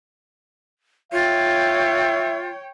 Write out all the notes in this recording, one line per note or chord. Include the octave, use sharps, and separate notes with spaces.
F4 C#5 E5 G5